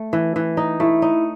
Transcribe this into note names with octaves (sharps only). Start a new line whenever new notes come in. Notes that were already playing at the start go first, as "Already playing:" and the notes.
Already playing: A3
E3
E3
D#4
A3 E4
D#4